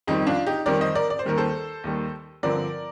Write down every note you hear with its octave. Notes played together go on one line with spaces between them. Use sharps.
F2 D#3 G3 C4 D#4 G4
D4 F4
D#4 G4
F2 D#3 G3 C4 A#4 D5
C5 D#5
A#4 D5
D5
C5
D#2 D#3 G3 A#4
A4 C5
D#2 D#3 G3
G2 D3 F3 C4 A#4 D5